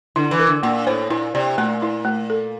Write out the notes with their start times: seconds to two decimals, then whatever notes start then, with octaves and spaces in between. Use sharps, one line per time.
0.16 D3 E4
0.31 E3
0.39 A#4
0.47 D3
0.63 A#2 A#3
0.87 A2 C5
1.10 A#2 E4
1.35 C3 D5
1.58 A#2 A3
1.82 E4
2.05 A3
2.30 A4